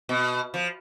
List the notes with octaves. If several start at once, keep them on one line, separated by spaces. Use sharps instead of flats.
B2
F3